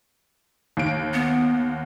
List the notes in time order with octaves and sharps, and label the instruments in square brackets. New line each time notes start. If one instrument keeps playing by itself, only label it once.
[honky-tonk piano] D#2 D7
[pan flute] B3